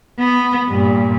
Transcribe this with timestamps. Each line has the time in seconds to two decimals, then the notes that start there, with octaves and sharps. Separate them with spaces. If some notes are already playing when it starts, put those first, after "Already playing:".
0.19 B3
0.69 G2 A#2